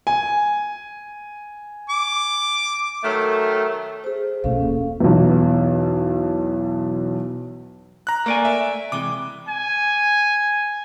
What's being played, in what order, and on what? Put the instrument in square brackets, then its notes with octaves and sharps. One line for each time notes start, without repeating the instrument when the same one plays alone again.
[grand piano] G#5
[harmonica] D6
[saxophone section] D#3 F#3 A3
[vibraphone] G#4 C5
[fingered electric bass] A#1 B2 A3 [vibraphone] C#4 A4 F5
[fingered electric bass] D#1 A#3
[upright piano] B1 E2
[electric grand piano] A#5 F#6
[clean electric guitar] A3 D5 G#5 [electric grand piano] A#3
[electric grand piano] E5
[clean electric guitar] C3 E3 G#3 [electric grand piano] D6
[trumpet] G#5